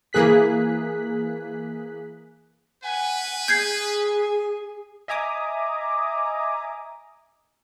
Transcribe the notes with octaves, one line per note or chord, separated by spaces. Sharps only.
E3 A#3 G#4 F#6 B6
B4 F#5 G#5
G#4 G6 G#6 C7
D#5 E5 G#5 A#5 D6 D#6